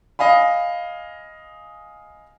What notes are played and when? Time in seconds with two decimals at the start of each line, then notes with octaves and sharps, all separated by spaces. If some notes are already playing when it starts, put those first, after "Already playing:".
0.19 D#5 F5 G#5 B5